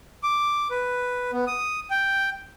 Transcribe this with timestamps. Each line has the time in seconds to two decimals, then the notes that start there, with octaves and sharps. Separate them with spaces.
0.23 D6
0.71 B4
1.33 B3
1.47 D#6
1.90 G5